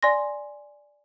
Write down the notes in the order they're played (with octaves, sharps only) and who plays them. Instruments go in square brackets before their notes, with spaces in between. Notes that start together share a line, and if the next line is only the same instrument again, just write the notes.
[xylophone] D5 G#5 C6 A#6